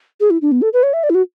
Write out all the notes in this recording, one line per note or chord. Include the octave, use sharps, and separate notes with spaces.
G#4
E4
D4
B3
A4
B4
C#5
E5
D5
E4
F#4